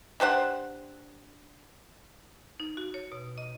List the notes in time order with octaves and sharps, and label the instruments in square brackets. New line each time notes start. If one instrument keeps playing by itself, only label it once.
[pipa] D4 G4 C5 F#5
[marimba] D#4
F#4
C#5
B2
D#5